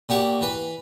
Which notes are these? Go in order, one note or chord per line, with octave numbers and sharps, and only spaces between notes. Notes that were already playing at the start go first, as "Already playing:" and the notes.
A#2 G4 F#5 C#6
E3 B4